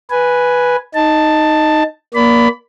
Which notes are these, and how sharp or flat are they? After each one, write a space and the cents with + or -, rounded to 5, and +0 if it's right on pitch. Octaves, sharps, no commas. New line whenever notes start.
B4 -5 G#5 +0
D#4 +0 A5 +10
A#3 +20 D5 -25 B5 +15